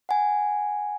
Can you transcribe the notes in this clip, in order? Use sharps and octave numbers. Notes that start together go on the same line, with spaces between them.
F#5 G#5